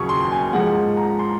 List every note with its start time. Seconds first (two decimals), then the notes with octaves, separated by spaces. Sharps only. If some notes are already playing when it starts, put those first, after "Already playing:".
Already playing: D#2 C#3 F#3 C#6
0.09 C6
0.32 G#5
0.53 G#2 F3 G#3 F#5
0.97 A#5
1.19 C6